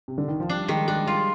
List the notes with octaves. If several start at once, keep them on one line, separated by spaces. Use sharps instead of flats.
C3
D3
D#3
F3
G3 D4
D#3 G#3
G#3 D4
G3 F4